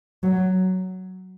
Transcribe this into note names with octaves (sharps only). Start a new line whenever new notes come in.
F#3